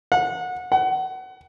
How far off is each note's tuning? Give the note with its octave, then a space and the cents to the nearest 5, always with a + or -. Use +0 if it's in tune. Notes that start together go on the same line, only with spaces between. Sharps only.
F#5 -25
F#5 +25